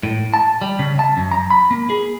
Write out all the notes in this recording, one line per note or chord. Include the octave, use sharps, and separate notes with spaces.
A2
A5
G3
C#3
A5
F#2
A#5
B5
A#3
G#4